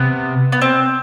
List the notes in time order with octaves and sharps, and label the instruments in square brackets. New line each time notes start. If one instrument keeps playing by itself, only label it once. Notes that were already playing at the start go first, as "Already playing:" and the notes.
Already playing: [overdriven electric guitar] C3 [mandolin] B3
[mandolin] B3
C4